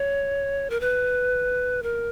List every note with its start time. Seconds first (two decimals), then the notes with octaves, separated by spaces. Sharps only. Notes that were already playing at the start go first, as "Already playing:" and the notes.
Already playing: C#5
0.70 A#4
0.80 B4
1.83 A#4